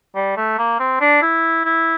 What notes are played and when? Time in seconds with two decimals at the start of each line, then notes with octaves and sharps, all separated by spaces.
0.15 G3
0.37 A3
0.58 A#3
0.79 C4
1.01 D4
1.22 E4
1.65 E4